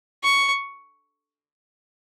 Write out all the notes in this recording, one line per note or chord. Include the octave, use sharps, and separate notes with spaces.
C#6